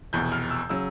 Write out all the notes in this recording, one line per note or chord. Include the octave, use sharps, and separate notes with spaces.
F1 E2 B2 G6
F6
E6
C#3 F#3 E6